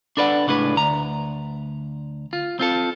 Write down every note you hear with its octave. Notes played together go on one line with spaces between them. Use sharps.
D4 A4 B4 D5 E5 F#5
C#2 A2 D4 G#4 B4
D2 A#5
F4
C4 F4 A4